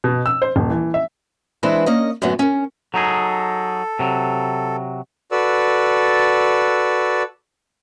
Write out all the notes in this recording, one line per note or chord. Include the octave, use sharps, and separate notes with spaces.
B2
E6
C5
D#1
E3
E5
E3 G#3 C4 D4 E4 B4
A#3 C#4 D#5
F#2 A2 D3 F#3 B3 G#5
C#4 A#4
F#3 D#4 G#4 A4
C3 F#3
F#4 A4 B4 D5 E6